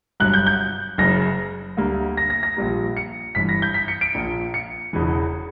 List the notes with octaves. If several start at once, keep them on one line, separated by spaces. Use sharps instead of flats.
G1 G2 F#3 F#6
G6
G6
F#1 F#2 C#3 A#6
D2 D3 G3 A#3
A#6
A#6
A#6
A#1 A#2 G3 A#3
C#7
G1 G2 E3 B6
A#6
G6
B6
C#7
D7
A#1 A#2 A#3
C#7
E1 E2 C#3 E3